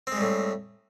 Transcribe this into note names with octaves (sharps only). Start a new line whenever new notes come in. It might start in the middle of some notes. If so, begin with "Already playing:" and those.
A2 G3 G#3 C4